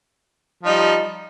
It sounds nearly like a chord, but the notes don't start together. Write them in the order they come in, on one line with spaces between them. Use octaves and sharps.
F3 D#4 G3